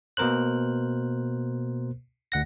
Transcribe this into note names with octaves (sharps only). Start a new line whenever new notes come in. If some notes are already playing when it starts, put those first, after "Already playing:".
B2 A#3 A#4 C5 F#6
D2 F#5 A#6